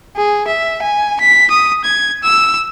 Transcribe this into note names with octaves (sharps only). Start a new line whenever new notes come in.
G#4
E5
G#5
B6
D#6
G#6
E6